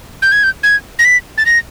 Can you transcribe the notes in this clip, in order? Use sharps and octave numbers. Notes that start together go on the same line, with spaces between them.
G6
G#6
G6
G#6
A#6
B6
A6
A#6